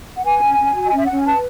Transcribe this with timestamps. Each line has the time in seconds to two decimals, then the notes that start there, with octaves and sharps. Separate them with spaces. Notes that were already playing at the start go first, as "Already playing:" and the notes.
0.16 F#5
0.25 B4 G#5
0.41 C#4
0.58 C#4
0.75 F#4
0.86 D#5
0.92 C#4 E5
1.06 C#4 F#5
1.17 G#5
1.26 B4 A5